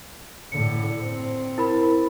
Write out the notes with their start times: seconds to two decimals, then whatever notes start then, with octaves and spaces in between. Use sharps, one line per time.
0.52 A2 D3 C#7
1.03 C4
1.58 E4 A#4 B5